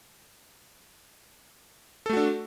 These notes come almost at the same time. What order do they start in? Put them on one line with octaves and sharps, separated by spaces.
A4 A3 F#4 D4